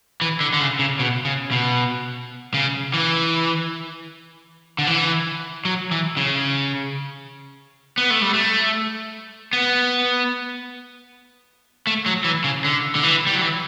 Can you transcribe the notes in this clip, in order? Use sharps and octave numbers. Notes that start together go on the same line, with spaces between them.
E3
D3
D3
C#3
C#3
B2
C#3
B2
C#3
E3
D3
E3
F#3
E3
C#3
B3
A3
G3
A3
B3
A3
F#3
E3
C#3
D3
D3
E3
G3
F#3
E3